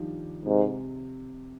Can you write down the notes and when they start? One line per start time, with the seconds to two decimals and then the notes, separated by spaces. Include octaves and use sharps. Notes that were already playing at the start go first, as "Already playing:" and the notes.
Already playing: D#3 F3 G3 D4
0.45 G#2 C3